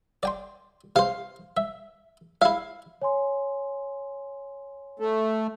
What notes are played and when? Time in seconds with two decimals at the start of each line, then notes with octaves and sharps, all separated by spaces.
0.23 D5 G5 C6
0.96 C3 C5 F5
1.57 E5
2.42 E4 E5 F5
3.01 C#5 G#5 C6
5.00 A3